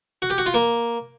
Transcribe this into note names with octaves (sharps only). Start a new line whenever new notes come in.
F#4
G4
F#4
F4
A#3